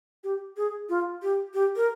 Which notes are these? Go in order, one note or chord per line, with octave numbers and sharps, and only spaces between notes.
G4
G#4
F4
G4
G4
A#4